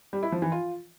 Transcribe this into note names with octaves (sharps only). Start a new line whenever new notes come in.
G3
E4
F3
E3
F4